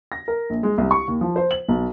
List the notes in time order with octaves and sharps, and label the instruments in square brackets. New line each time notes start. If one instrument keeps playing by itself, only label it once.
[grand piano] A#6
A#4
A#1
G#3
C2
C#6
D#2
F3
C5
F#7
B1